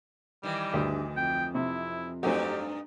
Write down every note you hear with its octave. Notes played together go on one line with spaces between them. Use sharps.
D#3 E3 G3
D2 G2
F2 G5
C3 E4
G2 F#3 A3 C4 D#4 G4